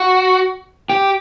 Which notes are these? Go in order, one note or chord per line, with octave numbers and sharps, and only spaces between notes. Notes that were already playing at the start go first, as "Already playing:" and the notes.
Already playing: F#4
G4